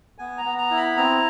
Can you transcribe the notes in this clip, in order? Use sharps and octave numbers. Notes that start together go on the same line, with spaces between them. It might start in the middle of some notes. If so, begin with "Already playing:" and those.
B3 G#5
A#5
B3
A#5
E4
B5
C4 A#5